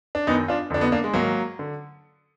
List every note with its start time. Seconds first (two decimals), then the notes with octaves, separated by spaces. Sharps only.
0.15 D4
0.27 F#2 D#3 B3 D#4
0.48 D4 F4
0.70 F2 D3 D4
0.81 B3 D#4
0.92 A#3 D4
1.04 G#3
1.14 G#2 D#3 F#3 A#3
1.59 D3